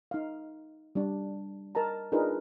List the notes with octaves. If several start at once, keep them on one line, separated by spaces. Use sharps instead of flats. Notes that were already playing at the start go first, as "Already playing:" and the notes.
D#4 F5
G3 D4
A#4 D#5 A5 A#5
D4 D#4 F4 G#4 A#4 B4